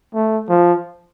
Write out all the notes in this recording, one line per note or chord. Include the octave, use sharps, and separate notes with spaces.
A3
F3